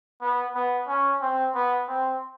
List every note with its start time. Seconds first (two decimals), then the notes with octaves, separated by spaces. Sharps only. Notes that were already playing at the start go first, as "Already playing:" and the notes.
0.21 B3
0.55 B3
0.88 C#4
1.21 C4
1.55 B3
1.88 C4